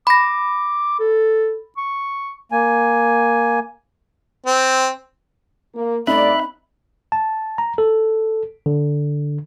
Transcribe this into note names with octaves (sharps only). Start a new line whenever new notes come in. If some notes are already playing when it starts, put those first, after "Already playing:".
B5 D6 A#6
A4
C#6
A#3 G#5
C4
A#3
G2 A3 C4 D#4 D5 E5 B5 F#6
A5
A#5
A4
D3